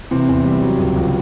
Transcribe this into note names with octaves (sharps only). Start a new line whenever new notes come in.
C3 E3 C4
E2
G3
F#3
C#2
C#2